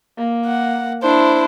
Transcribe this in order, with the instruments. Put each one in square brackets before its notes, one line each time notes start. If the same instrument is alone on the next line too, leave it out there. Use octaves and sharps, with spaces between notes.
[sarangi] A#3
[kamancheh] F#5
[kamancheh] D4 E4 [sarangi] C5